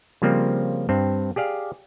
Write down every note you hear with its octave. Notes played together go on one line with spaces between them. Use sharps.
C#3 F3 G3 A#3 C4
G2 C4
G4 G#4 D5 F5